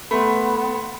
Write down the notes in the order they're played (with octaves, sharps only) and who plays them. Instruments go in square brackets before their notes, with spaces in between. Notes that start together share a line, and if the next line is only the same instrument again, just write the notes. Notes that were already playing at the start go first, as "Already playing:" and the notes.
[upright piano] A3 [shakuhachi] B3 [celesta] B5 C6